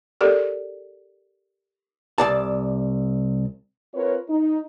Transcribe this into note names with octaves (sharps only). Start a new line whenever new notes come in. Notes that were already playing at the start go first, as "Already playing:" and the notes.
G4 A4 A#4 D5
C2 D5 A5
C4 F4 A#4 B4 C#5
D#4